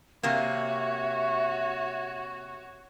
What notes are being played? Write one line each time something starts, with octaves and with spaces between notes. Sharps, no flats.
C3 A#3 F#4 C#5 E5